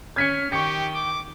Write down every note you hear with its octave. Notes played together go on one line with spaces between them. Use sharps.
C#4 F6 G#6 B6 C#7
D#3 G4 G5 C#6 C#7
D6